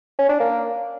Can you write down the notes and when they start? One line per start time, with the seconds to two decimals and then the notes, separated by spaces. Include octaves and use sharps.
0.19 C#4
0.29 D4
0.40 A#3